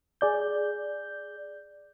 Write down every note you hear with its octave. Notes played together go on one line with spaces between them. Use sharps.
G#4 D5 G6